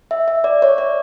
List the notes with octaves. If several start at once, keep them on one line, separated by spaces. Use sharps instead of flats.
E5
E5
D5
C#5
D5